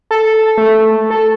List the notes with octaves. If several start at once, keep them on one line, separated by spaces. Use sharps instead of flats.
A4
A3
A4